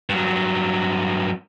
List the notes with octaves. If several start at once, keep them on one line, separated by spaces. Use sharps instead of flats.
G2 F#3